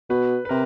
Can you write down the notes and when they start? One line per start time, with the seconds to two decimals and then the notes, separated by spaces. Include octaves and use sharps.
0.10 B2 B4
0.45 B4
0.49 C3 A#4